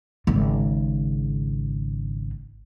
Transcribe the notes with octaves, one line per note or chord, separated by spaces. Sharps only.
G#1 C#3